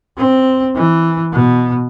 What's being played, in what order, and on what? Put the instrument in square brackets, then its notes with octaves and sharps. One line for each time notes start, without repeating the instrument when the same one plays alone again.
[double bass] C4
E3
B2